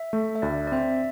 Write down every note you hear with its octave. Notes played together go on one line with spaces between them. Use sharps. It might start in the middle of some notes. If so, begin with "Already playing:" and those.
Already playing: E5
A3
E5
D2 D5
D5
C4 E5